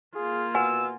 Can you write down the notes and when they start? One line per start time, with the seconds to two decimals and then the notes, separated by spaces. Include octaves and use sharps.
0.15 A#3 F4 G#4
0.55 B2 F#5 G#5 E6